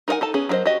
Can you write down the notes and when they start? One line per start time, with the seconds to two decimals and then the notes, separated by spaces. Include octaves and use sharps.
0.08 D#4 A#4 C#5 F#5 G#5
0.21 D#4 A4 A5
0.34 B3 C#4 G#4
0.49 F#3 E4 A#4 C5 D#5
0.66 F#4 G4 D#5